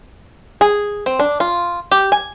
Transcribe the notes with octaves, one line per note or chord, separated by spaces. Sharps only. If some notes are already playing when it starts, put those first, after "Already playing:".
G#4
C4
D4
F4
G4
G#5